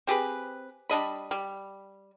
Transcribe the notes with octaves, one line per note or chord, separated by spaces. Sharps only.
C4 G4 G#4 B4
G3 D4 D#5 B5
G3